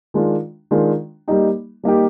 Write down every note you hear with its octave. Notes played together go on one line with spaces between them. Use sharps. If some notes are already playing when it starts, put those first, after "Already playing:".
D#3 G#3 D4 F4
D#3 G#3 D4 F4
G3 A#3 D#4 G4
G3 A#3 D#4 G4